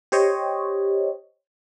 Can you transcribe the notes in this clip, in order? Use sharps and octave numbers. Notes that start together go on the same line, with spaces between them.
G4 C5 C#5 D#5